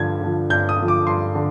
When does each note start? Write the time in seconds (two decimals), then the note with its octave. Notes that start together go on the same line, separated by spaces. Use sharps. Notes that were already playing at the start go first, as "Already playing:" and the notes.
Already playing: G2 D3 F3 G#6
0.21 D3 F3
0.50 G2 G6
0.69 D#6
0.79 D3 F3
0.88 D6
1.07 G2 C6
1.35 D3